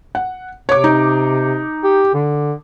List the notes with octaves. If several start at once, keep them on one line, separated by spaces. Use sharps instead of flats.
F#5
C3 C#5 D6
D#4
G4
D3